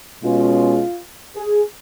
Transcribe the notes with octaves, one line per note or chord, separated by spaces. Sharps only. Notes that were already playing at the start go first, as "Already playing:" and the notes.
B2 G#3 C#4 F4
G#4